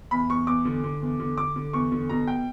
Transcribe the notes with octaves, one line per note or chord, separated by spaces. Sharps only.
E2 B5
E2 C#6
E2 D6
D3
D3
E2
D3
D3 D6
D3
E2 C#6
D3
B2 A#5
G5